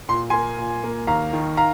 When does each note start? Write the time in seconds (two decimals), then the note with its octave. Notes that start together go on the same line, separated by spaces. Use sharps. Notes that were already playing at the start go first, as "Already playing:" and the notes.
0.09 A#2 C6
0.30 A#3 G#5 C6
0.58 A#2
0.84 A#3
1.07 D#2 F5 A#5
1.33 D#3
1.57 F5 A#5